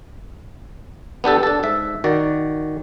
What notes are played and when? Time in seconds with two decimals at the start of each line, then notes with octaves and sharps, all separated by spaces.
1.24 B3 D4 G4 A4
1.43 D4 A4
1.63 G#2 E5
2.04 D#3 F#4 D5